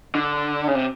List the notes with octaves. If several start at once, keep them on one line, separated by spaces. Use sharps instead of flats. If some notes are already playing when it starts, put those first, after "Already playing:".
D3
C#3
C3